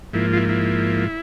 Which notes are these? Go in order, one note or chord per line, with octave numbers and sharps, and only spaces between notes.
G#2 F3 A#3 E4
F4
E4
E4